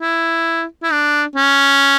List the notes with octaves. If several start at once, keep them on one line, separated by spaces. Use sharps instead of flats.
E4
E4
D4
C#4